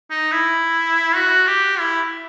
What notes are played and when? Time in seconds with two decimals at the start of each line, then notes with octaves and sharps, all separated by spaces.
0.10 D#4
0.32 E4
1.16 F#4
1.47 G4
1.79 E4